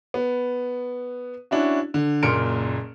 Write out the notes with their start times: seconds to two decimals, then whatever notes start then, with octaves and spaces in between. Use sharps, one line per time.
0.14 B3
1.51 C#4 D4 E4 F#4
1.94 D3
2.23 F#1 A#2 C6 F6 C#7 D7